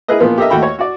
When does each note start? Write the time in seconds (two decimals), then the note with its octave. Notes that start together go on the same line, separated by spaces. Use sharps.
0.08 E4 G#4 A#4 B4 D#5
0.20 A#2 F3 A#3 B3
0.38 G4 A4 A#4 D#5 E5
0.50 D#2 A3 F#4 G5 B5
0.63 C#5
0.79 F#4 D5